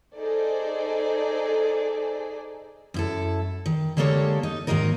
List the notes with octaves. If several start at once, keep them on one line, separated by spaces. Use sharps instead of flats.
D#4 G#4 A4 C5 D5
F#2 E4 A4
D#3
D3 G#3 A#3 G4 A4 C#5
D#4
G#2 D#3 F#3 A#3 D#4 A#4